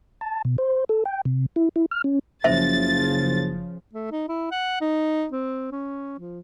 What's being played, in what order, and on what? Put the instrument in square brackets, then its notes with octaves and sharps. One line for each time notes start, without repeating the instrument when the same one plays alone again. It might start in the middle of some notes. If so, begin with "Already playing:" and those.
[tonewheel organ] A5
B2
C5
A4
G5
C3
E4
E4
F6
C#4
[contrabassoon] F#1 [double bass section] C#3 F3 [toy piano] C5 E5 [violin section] A6
[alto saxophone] A3
D#4
E4
F#5
D#4
C4
C#4
F3